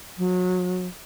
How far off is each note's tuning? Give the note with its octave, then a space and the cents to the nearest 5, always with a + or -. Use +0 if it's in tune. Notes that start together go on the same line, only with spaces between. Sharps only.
F#3 -30